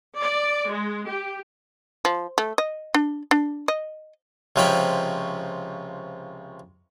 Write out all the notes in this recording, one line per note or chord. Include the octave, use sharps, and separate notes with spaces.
D5
G#3
G4
F3
A3
D#5
D4
D4
D#5
C#2 C3 F3 C#5 G5 B5